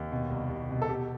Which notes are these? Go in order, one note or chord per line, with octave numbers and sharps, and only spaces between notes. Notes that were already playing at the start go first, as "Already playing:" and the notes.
Already playing: D#2
B2
C2
C2
B2
A4
B2 G4